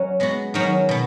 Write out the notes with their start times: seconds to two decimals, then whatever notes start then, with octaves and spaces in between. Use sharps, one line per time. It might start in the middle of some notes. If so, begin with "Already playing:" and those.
Already playing: F#3 C#4
0.20 G#3 B3 F#4
0.54 D#3 F#3 C#4 F#4
0.89 B2 B3